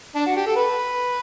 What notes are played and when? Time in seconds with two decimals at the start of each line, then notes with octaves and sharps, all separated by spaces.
0.15 D4
0.27 F#4
0.36 G4
0.47 A4
0.56 B4